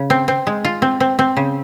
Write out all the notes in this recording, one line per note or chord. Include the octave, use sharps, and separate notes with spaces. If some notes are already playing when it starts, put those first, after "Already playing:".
Already playing: C#3
C4
C4
G#3
F4
C4
C4
C4
C#3